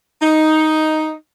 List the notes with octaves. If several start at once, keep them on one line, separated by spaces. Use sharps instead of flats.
D#4